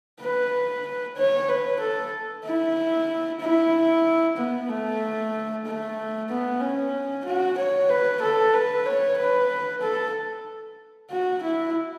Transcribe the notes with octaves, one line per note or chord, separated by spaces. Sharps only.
B4
C#5
B4
A4
E4
E4
B3
A3
A3
B3
C#4
F#4
C#5
B4
A4
B4
C#5
B4
A4
F#4
E4